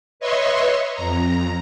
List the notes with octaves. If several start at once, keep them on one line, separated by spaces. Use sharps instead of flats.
B4 C#5 D#5 E5 C6 C#6
F2 A#5